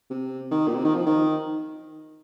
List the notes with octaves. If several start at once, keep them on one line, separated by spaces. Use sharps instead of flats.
C3
D#3
A#2
C3
D#3
F3
D#3